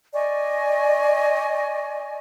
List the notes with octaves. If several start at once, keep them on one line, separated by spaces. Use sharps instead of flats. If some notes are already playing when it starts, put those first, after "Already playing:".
D5 D#5 G#5 C#6